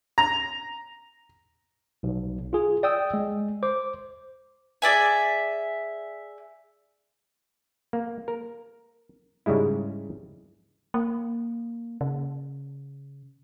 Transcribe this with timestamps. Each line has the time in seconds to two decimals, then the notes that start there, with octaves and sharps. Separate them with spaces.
0.18 A#5
2.03 B1
2.53 F4 G#4
2.83 D5 G5 D#6 E6
3.14 G#3
3.63 C5 D6
4.82 G#4 D5 E5 G#5
7.93 A#3
8.28 A#4
9.46 G#2 C#3 G3 G#3 E4
10.94 A#3
12.01 C#3